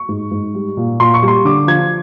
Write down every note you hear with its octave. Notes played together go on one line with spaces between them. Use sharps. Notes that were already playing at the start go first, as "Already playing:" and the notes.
Already playing: C#6
G#2
G#2
G3
A#2
A#2 C6
C#6
G3
C6
D3 D6
F3 G#6